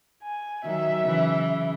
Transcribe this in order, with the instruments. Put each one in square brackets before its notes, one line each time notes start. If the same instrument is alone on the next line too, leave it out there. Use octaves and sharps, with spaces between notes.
[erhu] G#5
[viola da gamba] D#3 F#3 [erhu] E5
[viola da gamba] C#3 E3